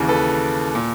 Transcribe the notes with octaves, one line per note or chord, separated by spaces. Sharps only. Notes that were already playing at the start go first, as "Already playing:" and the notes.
Already playing: D#2 C#3 E3
A4 B4
A#2